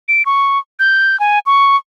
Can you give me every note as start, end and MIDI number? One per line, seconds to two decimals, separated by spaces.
0.08 0.25 98
0.26 0.59 85
0.79 1.19 91
1.20 1.39 80
1.46 1.76 85